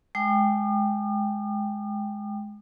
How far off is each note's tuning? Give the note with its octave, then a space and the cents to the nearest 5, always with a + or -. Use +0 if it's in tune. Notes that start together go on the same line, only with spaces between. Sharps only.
G#3 +15 G5 +0 D#6 -45